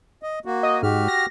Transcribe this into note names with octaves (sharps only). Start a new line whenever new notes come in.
D#5
A#3 F#4
D#5
G#2 F#4 G4 F6
A#6